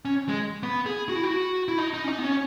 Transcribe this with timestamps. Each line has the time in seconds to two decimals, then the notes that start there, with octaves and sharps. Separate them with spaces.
0.05 C#4
0.29 G#3
0.63 B3
0.86 G#4
1.09 F#4
1.16 E4
1.24 F#4
1.68 E4
1.78 D#4
1.94 D#4
2.04 C#4
2.09 D#4
2.18 B3
2.24 C#4